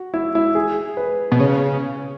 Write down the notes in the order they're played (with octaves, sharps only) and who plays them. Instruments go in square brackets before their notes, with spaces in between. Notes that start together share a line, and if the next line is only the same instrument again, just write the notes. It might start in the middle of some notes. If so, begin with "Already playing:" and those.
Already playing: [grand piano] F#4
E4
E4
G#4
B4
[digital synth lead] B2 [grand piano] B4
[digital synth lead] C#3 [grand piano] C#5